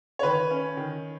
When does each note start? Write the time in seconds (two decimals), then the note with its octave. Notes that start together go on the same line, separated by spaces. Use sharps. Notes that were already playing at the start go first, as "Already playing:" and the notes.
0.19 C#5
0.23 D#3 B4
0.51 C#4
0.77 D#3